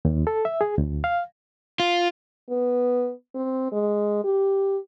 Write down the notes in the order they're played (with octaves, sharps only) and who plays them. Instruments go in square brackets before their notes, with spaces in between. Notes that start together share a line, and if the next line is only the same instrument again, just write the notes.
[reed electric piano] D#2
A4
E5
G#4
D2
F5
[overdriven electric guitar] F4
[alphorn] B3
C4
G#3
G4